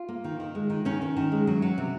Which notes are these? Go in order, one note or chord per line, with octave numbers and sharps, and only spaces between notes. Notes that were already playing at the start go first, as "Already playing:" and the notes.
Already playing: F4
A#3
D#3
D#3
G#3
D#3
D#3 C#4
D#3
D#3
G#3
F#3
F#3
C3